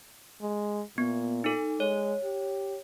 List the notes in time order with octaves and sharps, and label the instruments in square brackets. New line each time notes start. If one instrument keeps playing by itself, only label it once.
[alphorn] G#3
[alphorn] A#2 [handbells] B3
[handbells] D#4 A4
[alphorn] G#3 [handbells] C#5
[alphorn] G4